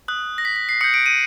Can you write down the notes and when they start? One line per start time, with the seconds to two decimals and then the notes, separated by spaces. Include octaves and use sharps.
0.08 D#6 F#6
0.38 A#6
0.45 B6
0.56 B6
0.69 C7
0.81 D#6 G6 C#7
0.94 D7
1.06 D#7